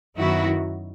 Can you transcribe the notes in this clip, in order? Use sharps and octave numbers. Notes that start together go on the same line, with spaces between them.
F#2 D#3 F#3 B3 E4 F#4